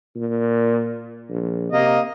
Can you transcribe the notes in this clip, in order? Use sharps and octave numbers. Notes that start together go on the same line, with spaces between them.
A#2
A#1
C3 A#3 D#5